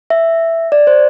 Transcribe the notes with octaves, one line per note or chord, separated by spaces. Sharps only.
E5
D5
C5